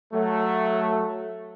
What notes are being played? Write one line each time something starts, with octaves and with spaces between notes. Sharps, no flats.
F#3 A3